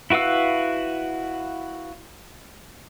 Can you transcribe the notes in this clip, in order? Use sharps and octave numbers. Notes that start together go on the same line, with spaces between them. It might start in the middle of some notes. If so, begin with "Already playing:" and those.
E4 F#4 B4 F5 E6